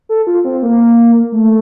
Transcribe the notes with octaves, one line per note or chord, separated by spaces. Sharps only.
A4
F4
C4
A#3
A3